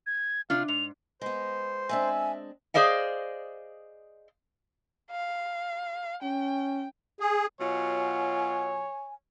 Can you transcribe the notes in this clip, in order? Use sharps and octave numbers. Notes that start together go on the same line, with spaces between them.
G#6
C3 D4 F4 F6
G#2 F7
G#3 B3 C5
G#3 C4 D4 E5 G#5
G#4 C5 D5 D#5 F5
F5
C#4 G5
G#4
B2 F#3 F4 C#5 G#5